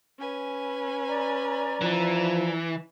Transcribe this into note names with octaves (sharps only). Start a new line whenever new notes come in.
C#4 B4 G#5
D5 A#5
E3 F3